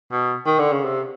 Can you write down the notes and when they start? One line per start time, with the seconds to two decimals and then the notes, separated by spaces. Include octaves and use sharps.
0.12 B2
0.46 D#3
0.59 D3
0.72 C#3
0.84 C3